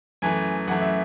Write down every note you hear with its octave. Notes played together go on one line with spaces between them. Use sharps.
F#2 E3 A3 G#5
F#2 E3 A3 F#5
E5